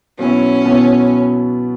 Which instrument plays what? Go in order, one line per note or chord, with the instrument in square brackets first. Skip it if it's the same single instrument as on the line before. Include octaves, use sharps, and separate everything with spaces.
[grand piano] B2 F#3 B3 E4 [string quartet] C#4
[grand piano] B2 F#3 B3 E4